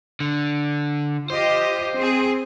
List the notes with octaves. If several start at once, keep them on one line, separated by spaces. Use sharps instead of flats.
D3
F4 G4 C5 D#5
C4 G#4